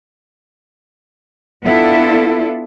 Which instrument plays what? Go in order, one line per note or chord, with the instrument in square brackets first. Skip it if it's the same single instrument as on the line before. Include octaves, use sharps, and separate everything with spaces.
[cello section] B3 D4 E4 F4 A4